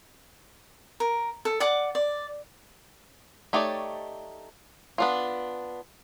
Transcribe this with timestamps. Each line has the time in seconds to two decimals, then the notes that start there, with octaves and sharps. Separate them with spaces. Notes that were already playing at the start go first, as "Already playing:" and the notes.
1.00 A#4
1.45 A4
1.60 D5 F#5 D6
1.95 D5
3.53 A3 D#4 G4 C#5 D5
4.98 B3 D4 F4